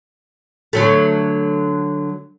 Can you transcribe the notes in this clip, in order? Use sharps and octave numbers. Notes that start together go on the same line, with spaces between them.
D3 F#3 A3